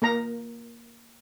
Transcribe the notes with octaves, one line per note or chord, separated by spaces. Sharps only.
A#3 A#4 A#5